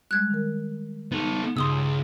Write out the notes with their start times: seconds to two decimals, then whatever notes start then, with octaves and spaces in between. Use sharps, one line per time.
0.11 G3 G#3 F#6 G#6
0.30 D#3 A#4
1.12 B3 D#4 A4
1.57 C#2 G2 C6 D#6 E6